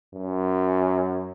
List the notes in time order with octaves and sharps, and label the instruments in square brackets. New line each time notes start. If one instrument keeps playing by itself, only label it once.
[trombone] F#2